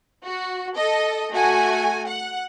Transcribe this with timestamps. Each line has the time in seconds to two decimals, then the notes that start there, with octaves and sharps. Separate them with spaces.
0.24 F#4
0.75 A4 D#5
1.32 A3 F#4 G#5
2.07 F#5